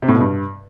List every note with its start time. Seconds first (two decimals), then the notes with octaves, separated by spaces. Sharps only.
0.02 C3
0.08 A2
0.14 B2
0.20 G2